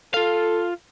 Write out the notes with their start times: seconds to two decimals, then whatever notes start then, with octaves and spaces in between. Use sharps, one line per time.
0.14 F4 A4 F5